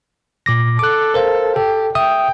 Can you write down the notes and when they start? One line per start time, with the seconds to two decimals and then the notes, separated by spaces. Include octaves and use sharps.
0.46 A#2 D6 A#6
0.79 A4 D6 F#6
1.14 A#4 C5 F5
1.56 G4 A4
1.95 E5 G5 D#6